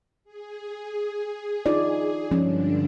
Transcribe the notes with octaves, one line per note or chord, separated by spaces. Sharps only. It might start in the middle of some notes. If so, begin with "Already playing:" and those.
G#4
D#4 F4 D5
G2 D3 F3 G#3 C#4 D4